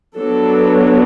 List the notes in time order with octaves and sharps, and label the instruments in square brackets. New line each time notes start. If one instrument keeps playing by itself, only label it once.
[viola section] F#3 B3 D4 A4